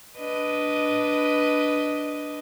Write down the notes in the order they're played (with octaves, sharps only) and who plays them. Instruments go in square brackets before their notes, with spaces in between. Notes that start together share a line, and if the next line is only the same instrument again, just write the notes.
[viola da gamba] D4 B4 D#5